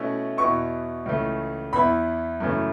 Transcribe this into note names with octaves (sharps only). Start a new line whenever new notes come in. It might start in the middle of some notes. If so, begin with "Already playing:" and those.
Already playing: B2 A3 C#4 E4
E2 B2 B3 E4 C#6
C#2 C#3 E3 A3
E2 E3 B3 E4 B5
F#2 C#3 E3 A3 E4